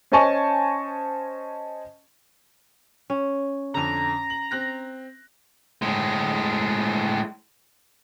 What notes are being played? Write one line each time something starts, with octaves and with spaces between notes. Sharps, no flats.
C#4 C5 D#5 G#5 A5 C#6
C#4
F2 D3 A#5
F#7
C4 F#6 A#6
A2 G#3